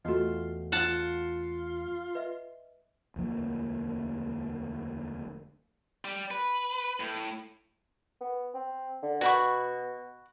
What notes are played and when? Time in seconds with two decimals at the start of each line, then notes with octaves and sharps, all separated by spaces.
0.05 E2 A3 F4 F#4 D#5
0.72 F4 F#5 A5
2.15 B4 D#5 E5
3.16 E1 D2 F3 A#3
6.05 G3
6.31 B4
7.00 A2
8.21 B3
8.54 C4
9.03 D3
9.21 B2 F#4 B5 C#6